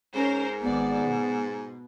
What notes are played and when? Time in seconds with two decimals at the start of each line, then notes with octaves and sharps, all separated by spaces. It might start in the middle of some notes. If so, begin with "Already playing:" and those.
0.15 G#2 C#4 A#4 C5
0.61 G#1 B3 D5
1.04 B2